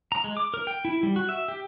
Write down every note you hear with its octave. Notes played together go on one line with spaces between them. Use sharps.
A#5
G#3
D6
A#4
G5
E4
G3
F#4
E5
G4